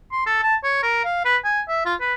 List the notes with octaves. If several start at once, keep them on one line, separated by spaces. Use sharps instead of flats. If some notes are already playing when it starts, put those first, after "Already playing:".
C6
A4
A5
C#5
A#4
F5
B4
G#5
E5
F4
B4